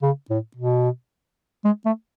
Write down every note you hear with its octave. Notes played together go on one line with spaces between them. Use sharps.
C#3
A2
B2
G#3
A3